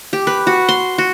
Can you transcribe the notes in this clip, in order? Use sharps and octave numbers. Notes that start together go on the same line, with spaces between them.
G4
B4
F#4
C6
F#4